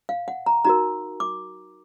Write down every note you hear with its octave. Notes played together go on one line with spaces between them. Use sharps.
F5
F#5
A#5
D#4 F#4 A#4 A#5
D6